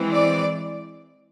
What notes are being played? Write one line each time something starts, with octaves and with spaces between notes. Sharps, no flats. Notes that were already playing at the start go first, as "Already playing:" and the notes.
Already playing: E3 G#3 C4
D5